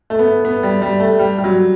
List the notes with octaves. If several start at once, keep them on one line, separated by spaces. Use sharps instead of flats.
A3
B3
B3
G3
G3
A3
G3
G3
F#3